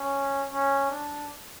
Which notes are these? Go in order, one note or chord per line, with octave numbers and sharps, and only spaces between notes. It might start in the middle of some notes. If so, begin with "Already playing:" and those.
Already playing: C#4
C#4
D4